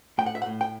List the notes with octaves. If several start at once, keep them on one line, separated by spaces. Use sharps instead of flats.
A2 G5
F#5
E5
F#5
A2
G5